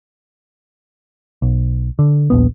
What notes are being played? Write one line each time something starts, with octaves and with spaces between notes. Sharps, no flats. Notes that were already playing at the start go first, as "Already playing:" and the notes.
B1
D3
D#1 A#1 B3